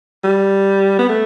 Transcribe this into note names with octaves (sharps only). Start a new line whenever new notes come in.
G3
B3
A3